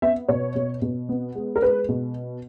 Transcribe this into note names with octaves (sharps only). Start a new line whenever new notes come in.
B3 E5
B2 C#5
B2
B2
B3
G#3
A#4
G#3 B4
B2